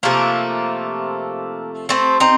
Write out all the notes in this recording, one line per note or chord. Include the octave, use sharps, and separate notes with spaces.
C3 F3 A3 A#3
A3 C4
C4 D#4